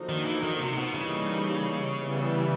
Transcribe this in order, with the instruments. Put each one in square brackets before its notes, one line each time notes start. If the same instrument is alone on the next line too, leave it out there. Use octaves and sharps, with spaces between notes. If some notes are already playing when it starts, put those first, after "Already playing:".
Already playing: [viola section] D3 F3 A#3 D#4 F#4
[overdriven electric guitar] D#3
E3
D#3
C3
B2
[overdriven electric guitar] C#3 [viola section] E3 G3 A#3 D#4
[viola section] E3 G3 B3